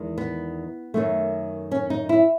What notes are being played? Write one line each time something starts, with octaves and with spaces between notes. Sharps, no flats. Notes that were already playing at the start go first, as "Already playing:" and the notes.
Already playing: E2 D#3 G#3
B3
F#2 D#3 A3
C#4
D#4
E4